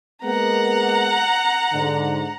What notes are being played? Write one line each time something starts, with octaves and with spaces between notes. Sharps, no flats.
G#3 A#3 B3 F#5 A#5
G#2 D3